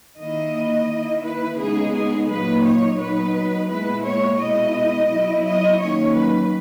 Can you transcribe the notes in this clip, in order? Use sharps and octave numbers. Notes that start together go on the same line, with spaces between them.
D#3 A#3 E4 D#5
D#3 A#3 E4
B4
C#3 G#3 B3 D#4 G#4
G#4
A#2 F#3 A#3 D#4 B4
C#5
F#3 B3 D#4 B4
A#2 G#3 B3 E4 B4
C#5
B2 G#3 B3 E4 D#5
F#3 B3 E4
D#5
D#3 F#3 A#3 C#4 C#5
B4